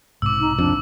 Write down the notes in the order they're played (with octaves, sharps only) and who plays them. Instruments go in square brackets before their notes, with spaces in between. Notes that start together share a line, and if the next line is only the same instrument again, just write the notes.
[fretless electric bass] B1 G#2 C3 [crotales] D6 E6
[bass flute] D#4
[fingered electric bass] F2 [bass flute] D4